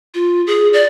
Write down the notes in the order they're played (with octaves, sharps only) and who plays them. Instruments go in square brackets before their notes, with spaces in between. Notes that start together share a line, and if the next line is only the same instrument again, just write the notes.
[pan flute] F4
G#4
D5